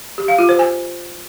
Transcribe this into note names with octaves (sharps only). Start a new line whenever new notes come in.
G4
F5
F4
C5
G#5